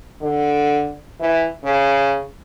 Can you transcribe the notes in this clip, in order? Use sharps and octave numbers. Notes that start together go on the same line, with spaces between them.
D3
E3
C#3